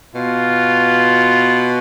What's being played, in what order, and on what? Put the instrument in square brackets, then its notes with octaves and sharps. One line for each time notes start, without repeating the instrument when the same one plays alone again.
[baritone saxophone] B2 [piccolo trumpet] F4